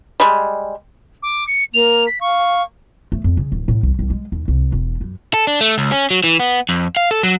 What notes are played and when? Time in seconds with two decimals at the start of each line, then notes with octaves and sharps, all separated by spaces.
0.20 G3 G#3
1.22 D6
1.47 C#7
1.74 A#3 F7
2.07 B6
2.21 F5 C#6
3.12 A3
3.24 F2
3.37 C#3
3.52 D1
3.68 A2
3.83 C2
3.99 C2
4.10 G#3
4.32 D#2
4.48 C2
4.72 E1
5.01 F#2
5.34 A4
5.47 D4
5.61 A3
5.78 C#2
5.92 C#4
6.11 F#3
6.24 E3
6.40 B3
6.69 F2
6.97 F5
7.11 A4
7.23 F#3